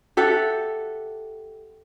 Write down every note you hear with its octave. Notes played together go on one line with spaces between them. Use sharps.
G4 A4 E5 F#5